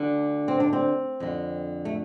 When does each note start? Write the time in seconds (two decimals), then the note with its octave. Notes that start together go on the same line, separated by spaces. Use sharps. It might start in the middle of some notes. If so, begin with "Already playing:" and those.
Already playing: D2 D3 D4
0.48 C4
0.60 D4
0.73 C4
1.20 F2 D3
1.85 A3